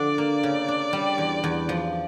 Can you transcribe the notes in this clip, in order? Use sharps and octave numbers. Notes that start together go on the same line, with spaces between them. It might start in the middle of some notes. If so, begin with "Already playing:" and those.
Already playing: D3 F3 D4 D5
A#3
C#3
D4
G3
E2
E2
F3